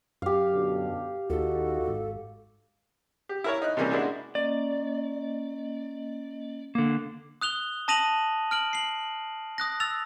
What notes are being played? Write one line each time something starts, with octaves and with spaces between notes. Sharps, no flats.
F#2 G4 F5
B2 D3
D#2 D#4 F4 F#4 A4
G#1
G4
E4 A#4 C#5
D#4 F#6
C3 E3 G3 A#3 C#4 G#4
G#3 A#3 D4 E4 F#4
A#3 C#4 D5 D#5
D3 A#3
D#6 F#6 F7 G7
A5 D#6 A#6 D#7 F7 F#7
F6 D7 F#7
C7 F#7
D#6 F#6 A#6
E6 A6 F7